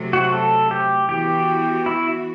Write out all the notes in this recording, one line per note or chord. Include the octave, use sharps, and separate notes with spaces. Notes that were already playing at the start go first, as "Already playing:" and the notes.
Already playing: C3 F#3 A3
F#4
A4
G4
E3 B3 F#4 G4
E4